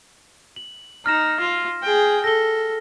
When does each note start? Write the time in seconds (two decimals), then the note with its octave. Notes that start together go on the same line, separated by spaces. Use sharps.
0.56 F#7
1.06 D#4 F6 A#6 E7
1.40 F4
1.83 G#4 G5
2.24 A4 A#6 G7